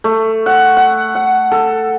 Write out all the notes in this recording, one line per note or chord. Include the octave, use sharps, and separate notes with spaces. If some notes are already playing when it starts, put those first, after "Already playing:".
A3
F#5
F#5
F#5
A4